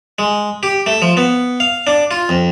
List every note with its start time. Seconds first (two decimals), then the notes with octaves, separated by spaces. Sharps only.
0.19 G#3
0.63 G4
0.86 A3
1.02 F3
1.17 B3
1.60 F5
1.87 D4
2.11 F4
2.29 F2